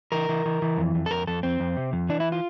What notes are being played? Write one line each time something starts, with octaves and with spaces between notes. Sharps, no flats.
E3 A#4
E3
E3
E3
F2
F2
A4
F2 A#4
F2 A4
F2 C4
F2
C3
F2
E3 D4
E4
F4